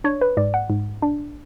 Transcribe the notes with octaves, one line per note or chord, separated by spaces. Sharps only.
D4 C#5
B4
G#2 D5
F#5
G#2
D4